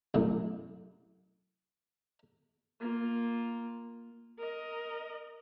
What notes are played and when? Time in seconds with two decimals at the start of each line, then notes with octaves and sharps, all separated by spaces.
0.14 C2 F#2 A2
2.81 A#3 F4
4.38 A#4 D#5